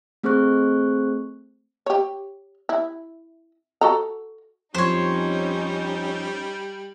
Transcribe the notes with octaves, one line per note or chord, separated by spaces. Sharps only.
A3 C4 G#4 C5 C#6 F#6
G4 C#5
E4
F#4 A4 A#5
F2 F3 G3 C#4 D#4 C5 C#5